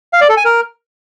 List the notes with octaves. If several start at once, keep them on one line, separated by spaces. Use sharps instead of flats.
F5
D5
A4
G#5
A#4